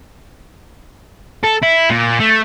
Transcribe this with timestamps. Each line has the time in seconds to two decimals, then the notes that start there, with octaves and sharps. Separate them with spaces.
1.44 A4
1.63 E4
1.90 A#2
2.19 A3